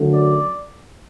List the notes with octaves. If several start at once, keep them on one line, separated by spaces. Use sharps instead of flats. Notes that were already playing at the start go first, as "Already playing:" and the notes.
Already playing: F#2 D3 F#3 A3
D5